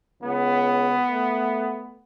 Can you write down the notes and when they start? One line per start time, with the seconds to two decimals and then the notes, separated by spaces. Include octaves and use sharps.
0.23 C#2 B3
1.07 A3